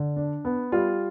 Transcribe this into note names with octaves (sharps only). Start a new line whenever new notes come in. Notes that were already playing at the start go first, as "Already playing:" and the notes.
Already playing: D3
D4
B3
G3 F4